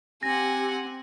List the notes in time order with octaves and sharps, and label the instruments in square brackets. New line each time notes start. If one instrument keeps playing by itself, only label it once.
[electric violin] C4 [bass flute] G4 [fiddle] F#5 G#5 [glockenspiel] A#6